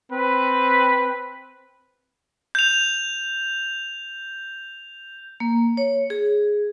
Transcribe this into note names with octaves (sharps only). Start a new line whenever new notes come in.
C4 B4
G6 F7
A#3
C#5
G#4